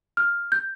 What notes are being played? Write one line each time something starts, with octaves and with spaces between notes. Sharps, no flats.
F6
G6